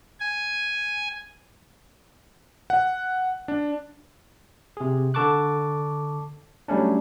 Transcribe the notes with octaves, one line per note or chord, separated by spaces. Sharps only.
G#5
F#5
D4
C3 G#4
D3 A4 A5 C#6 D6 F#6
F#3 G3 A3 C#4 D4